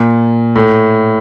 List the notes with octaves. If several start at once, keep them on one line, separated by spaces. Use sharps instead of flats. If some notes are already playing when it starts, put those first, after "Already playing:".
Already playing: A#2
A2